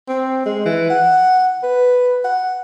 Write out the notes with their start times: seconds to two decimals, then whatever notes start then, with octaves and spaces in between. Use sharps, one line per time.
0.09 C4
0.46 G#3
0.65 E3
0.90 F#5
1.63 B4
2.24 F#5